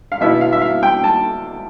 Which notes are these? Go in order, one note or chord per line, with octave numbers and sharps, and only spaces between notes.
F5
B2 B3 E4 E5
F5
E5
F5
G5
A5